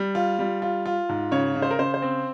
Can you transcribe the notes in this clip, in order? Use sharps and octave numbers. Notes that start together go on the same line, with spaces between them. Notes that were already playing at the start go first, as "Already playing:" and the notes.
Already playing: G3
F4
G3
F4
F4
G#2
C#3 C#5
C#3
C5
A#4
C#3 C5
C5
C4